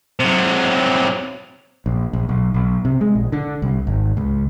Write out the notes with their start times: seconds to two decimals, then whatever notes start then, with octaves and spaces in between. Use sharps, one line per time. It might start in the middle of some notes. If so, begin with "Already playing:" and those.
0.19 C3 F#3
1.86 A#1
2.13 A#1
2.29 B1
2.54 B1
2.85 C3
3.01 G#3
3.15 A#1
3.32 D3
3.62 C2
3.87 G#1
4.17 C#2